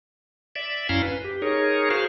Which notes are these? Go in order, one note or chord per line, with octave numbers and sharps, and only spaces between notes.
D5 E5
F#2 C#4 E4 F5 A#5 C6
B4
G4
D#4 G#4 A#4 C#5
F#4 G#4 C5 F5